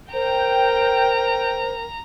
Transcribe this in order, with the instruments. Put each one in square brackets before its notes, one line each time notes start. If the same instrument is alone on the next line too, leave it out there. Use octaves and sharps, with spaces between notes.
[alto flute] A#4 [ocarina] C5 [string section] G5 [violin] A#5